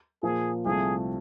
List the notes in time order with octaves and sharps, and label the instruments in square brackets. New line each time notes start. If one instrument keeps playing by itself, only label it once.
[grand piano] A#2 F3 A#3 [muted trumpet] G#4
[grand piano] C2 C3 F3 A3 [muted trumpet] G#4